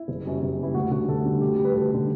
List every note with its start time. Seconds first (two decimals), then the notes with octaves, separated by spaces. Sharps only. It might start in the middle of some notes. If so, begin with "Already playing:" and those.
Already playing: E4
0.08 F#1
0.25 F#2 E3 G3
0.42 F#1
0.59 F#2 E3 G3 E4
0.74 D2 F#4
0.91 D3 G3 F#4
1.08 D2 A4
1.25 D3 G3
1.41 D2 G4
1.58 D3 G3
1.65 B4
1.74 D2 A4
1.91 D3 G3